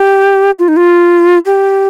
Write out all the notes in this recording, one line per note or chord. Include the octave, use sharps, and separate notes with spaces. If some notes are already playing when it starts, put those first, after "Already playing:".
Already playing: G4
F4
D#4
F4
G4